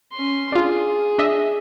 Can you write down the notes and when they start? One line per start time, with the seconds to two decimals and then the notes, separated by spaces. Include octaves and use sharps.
0.13 C#4 C6
0.52 D4 F4 G#4
1.18 D4 D#5 E5